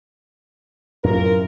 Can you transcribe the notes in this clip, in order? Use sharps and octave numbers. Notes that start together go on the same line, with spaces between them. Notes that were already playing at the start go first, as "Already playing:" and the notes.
F#2 A2 C3 F4 A#4